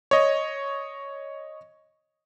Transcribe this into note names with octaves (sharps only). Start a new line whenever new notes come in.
C#5 D#5